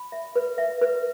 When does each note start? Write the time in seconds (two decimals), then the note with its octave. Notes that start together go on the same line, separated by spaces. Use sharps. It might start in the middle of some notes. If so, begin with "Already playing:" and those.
Already playing: B5
0.12 E5
0.36 B4
0.58 E5
0.81 B4